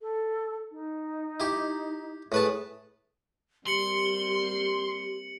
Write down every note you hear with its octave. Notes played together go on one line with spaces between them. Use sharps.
A4
D#4
E4 G4
A2 G#4 B4 A5
G3 A#3 C4 G4 C6 C#7 F#7